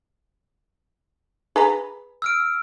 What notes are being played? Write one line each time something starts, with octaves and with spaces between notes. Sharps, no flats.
G#4 B4 A#5
E6 F6 D7